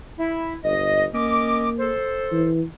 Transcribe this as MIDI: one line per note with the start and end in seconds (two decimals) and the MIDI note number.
0.19 0.54 64
0.64 1.07 31
0.64 1.05 75
1.14 1.92 58
1.14 1.69 61
1.14 1.69 75
1.14 1.69 86
1.79 2.48 69
1.79 2.48 72
2.32 2.63 52